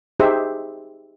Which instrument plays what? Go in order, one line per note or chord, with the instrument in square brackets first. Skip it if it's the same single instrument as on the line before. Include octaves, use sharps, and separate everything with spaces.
[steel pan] D#4 G4 G#4 C5 E5